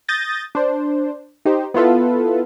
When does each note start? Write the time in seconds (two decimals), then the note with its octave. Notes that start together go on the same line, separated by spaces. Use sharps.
0.08 D#6 G6 A6 A#6
0.55 D4 C5
1.45 D#4 G4 C5
1.74 B3 E4 F4 A4 B4